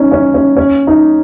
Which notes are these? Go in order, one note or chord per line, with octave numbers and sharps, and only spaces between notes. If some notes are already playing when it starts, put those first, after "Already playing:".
Already playing: C#4 D#4
C#4
C#4
C#4
D#4